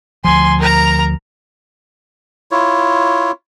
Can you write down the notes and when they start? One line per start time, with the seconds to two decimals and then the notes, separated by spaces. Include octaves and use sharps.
0.25 D2 F3 G#5 C6
0.59 A#4 A#5
2.51 E4 F4 C#5